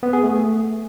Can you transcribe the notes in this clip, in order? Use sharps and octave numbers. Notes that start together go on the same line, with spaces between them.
B3
G#4
A3